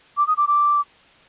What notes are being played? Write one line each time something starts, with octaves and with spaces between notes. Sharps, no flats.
D6
D#6
D6
D6